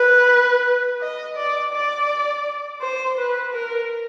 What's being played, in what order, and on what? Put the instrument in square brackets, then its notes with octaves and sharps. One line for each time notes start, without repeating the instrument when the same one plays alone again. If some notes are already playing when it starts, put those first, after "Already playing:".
Already playing: [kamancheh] B4
D#5
D5
D5
C5
B4
A#4